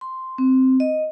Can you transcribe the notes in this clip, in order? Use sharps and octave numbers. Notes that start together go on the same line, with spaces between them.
C6
C4
D#5